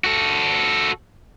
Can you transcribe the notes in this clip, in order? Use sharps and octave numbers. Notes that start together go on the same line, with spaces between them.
F#4 A4